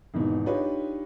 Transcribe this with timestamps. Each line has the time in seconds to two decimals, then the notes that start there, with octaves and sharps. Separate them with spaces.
0.14 G#1 E2 G#2 B2
0.46 D4 D#4 F4 G4 B4 C#5